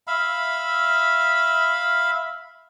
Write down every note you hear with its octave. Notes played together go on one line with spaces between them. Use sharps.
E5 F5 B5